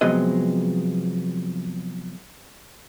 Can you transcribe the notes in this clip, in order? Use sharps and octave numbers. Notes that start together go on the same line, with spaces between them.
C3 F3 F#3 G#3 B3 D#5